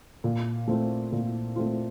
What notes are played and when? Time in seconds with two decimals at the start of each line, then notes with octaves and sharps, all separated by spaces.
0.24 A#2
0.68 A3 C4 F4
1.12 A#2
1.56 A3 C4 F4